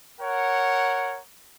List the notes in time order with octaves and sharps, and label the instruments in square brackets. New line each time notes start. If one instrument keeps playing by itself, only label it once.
[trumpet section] A#4 C#5 F#5